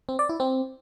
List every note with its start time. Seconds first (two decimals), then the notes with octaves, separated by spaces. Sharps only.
0.09 C4
0.19 D5
0.29 E4
0.40 C4